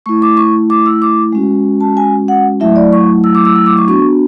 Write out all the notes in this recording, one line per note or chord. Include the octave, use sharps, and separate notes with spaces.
A3 E4 C#6
D6
C#6
D6
E6
D6
G#3 C#4 F#4
A5
G#5
F#5
F#3 A3 E4 E5
D5
C#6
E6
D6
E6
E6
D6
C#6
B3 D4 F#4 C#6